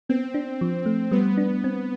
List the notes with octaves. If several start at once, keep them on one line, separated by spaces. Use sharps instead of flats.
B3 C4
D4
F3
A3
G3 B3
D4
C4